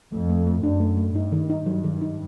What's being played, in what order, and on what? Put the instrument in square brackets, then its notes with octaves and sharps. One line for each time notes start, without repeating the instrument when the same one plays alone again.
[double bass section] F2 [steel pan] A3
[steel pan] A3
A3
[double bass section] F#2 [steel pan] D4
[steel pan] A3
A3
[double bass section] G2 [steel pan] D#4
[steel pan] D#3
D#4
[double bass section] G2 [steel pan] F#3
[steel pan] D#3
D#4